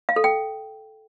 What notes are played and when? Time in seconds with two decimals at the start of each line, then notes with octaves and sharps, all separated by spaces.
0.09 F5
0.16 A4
0.24 G5